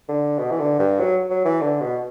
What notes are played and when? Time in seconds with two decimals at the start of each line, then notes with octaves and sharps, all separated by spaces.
0.08 D3
0.38 B2
0.51 E3
0.59 D3
0.79 G2
1.00 F#3
1.30 F#3
1.45 E3
1.61 D3
1.81 B2